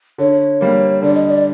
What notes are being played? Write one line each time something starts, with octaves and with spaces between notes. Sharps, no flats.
D3 C#5
G3 A#3
D3 D5
D#5
D5